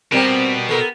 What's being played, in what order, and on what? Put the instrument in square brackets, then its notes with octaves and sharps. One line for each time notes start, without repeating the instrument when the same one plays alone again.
[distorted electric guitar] B2 [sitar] G3 A#4 [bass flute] C4
[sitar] B3 A#4 [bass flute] A4